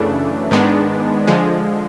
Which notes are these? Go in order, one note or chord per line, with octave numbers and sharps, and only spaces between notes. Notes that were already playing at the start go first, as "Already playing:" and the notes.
Already playing: F#2 C#3 E3 A3 D4
G#2 D#3 G#3 B3 D4
D3 F3 G#3